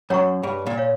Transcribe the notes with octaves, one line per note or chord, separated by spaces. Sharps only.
F#2 C#5 F#5 A#5 C#6
G2 G#4
A#2
C#5 F5